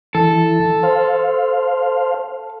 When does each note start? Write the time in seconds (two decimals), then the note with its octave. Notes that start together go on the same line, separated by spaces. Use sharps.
0.15 E3 A4
0.83 C5 F5